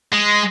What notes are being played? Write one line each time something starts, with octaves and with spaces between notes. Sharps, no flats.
G#3